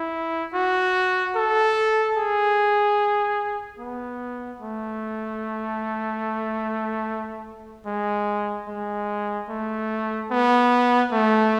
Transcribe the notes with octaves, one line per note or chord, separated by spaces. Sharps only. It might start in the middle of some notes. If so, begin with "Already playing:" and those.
Already playing: E4
F#4
A4
G#4
B3
A3
G#3
G#3
A3
B3
A3